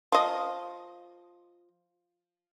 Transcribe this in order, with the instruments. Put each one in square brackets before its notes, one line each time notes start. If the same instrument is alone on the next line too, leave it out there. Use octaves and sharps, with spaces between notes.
[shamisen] F3 D#5